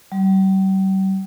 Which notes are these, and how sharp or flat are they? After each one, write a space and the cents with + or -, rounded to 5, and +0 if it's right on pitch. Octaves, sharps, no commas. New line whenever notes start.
G3 -40